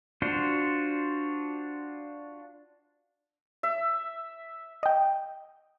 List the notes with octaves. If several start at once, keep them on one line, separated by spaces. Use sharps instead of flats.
D4 F4 F#4 C5
E5
D#5 G5